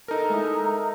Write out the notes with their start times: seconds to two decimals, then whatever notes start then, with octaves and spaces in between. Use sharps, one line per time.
0.08 D#4 A4 A#4 A#5
0.29 G#3 E4 D#6